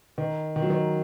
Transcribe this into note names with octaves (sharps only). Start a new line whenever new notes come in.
D#3
D#3
F#3
D#3